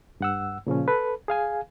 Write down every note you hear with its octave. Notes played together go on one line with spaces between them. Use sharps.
G2 F#5 E6
A#2 C#3 F3 C#4
A4 B4
G#4 F5 G#5